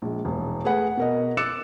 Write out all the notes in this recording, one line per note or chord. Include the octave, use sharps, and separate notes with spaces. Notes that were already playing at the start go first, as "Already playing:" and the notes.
A#1 G#3
E1 B3
A3 G#4 B4 F#5
B2 A#4 D#5
D6 E6 F#6 A6 C#7 E7